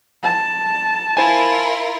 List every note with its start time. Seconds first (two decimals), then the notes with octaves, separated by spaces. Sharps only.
0.24 A5
1.17 E4 F4 A#4 C5 G#5